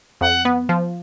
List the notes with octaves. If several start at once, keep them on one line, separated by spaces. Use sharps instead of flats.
F2 F#5
B3
F3